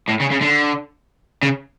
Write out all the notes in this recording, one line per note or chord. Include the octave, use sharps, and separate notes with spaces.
A2
C#3
C#3
D3
C#3